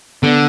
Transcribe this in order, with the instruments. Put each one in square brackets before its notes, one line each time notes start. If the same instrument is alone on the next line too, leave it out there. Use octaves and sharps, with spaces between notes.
[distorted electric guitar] D3 [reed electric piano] B3